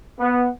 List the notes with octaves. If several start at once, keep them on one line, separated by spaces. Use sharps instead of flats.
B3